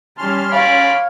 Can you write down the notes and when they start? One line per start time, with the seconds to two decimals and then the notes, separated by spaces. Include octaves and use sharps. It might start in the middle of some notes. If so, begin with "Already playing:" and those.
0.18 G3 C#4 A5 C6 F6
0.52 C#5 D5 F5 B5